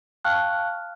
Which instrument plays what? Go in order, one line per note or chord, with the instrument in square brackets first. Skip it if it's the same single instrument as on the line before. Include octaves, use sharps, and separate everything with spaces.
[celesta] F5 G5 A5 C#6 F6 F#6